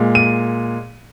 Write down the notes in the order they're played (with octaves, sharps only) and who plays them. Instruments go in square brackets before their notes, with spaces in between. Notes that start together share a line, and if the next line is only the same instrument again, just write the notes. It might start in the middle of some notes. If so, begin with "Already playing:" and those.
Already playing: [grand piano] A#2 G#3
D#7